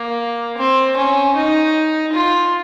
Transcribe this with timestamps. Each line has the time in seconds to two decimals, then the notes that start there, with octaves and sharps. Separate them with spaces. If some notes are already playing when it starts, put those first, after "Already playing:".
Already playing: A#3
0.58 C4
0.97 C#4
1.36 D#4
2.13 F4